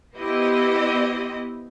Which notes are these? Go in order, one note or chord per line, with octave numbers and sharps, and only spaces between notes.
B3 E4 G4 C5 D#5